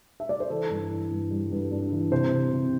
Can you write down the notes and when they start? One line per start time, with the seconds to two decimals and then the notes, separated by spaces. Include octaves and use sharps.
0.20 E5
0.29 D5
0.40 C5
0.50 E3 A4
0.70 G2
0.90 E3
1.11 G2
1.31 G3
1.51 G2
1.71 D4
1.92 E3
2.11 C3 C5
2.32 C3
2.52 C3